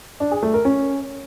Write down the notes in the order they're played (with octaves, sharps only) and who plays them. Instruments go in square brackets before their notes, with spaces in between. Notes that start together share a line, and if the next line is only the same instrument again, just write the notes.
[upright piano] D4
G#4
A3
A#4
C#4